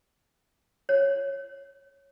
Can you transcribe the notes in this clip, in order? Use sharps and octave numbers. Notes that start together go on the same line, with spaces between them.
C#5